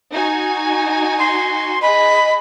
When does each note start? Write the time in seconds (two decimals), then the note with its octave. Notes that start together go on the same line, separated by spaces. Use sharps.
0.12 D#4 F#4 G#5
1.19 C6
1.82 G#4 D#5 B5